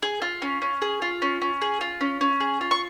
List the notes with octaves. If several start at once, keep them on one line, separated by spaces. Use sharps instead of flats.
G#4
F4
C#4
C#4
G#4
F4
C#4
C#4
G#4
F4
C#4
C#4
G#4
F4
C#6